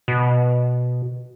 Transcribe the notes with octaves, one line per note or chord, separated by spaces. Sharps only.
B2